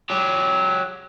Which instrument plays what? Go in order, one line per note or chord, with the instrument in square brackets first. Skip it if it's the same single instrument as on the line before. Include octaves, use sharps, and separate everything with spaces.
[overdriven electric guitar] F#3 G4